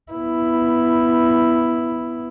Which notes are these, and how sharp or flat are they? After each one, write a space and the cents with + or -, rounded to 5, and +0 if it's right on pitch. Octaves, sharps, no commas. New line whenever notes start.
B3 +0 E4 +5